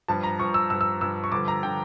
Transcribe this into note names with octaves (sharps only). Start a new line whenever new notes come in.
G2 F3 A5
A#5
G2 F3 C#6
E6
G2 F3 E6
E6
G2 F3 E6
C#6
G2 D3 F3 D6
A#5
D3 F3 G5